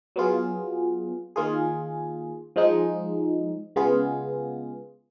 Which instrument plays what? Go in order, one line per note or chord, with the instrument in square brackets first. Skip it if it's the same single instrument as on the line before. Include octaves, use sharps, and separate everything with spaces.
[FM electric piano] F#3 B3 F4 G#4
D#3 A#3 F4 G#4
F3 G#3 D#4
C#3 G#3 B3 F4 G#4